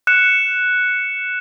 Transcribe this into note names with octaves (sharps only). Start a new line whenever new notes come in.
F#6 C#7 E7